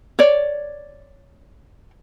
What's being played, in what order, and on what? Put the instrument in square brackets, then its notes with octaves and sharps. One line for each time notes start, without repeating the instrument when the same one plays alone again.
[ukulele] C#5 D5